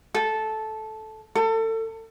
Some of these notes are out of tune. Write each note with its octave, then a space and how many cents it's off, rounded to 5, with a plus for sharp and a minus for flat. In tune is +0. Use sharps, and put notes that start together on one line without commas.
A4 -10
A4 +30